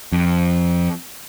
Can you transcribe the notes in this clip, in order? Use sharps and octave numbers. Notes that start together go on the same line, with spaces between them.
F2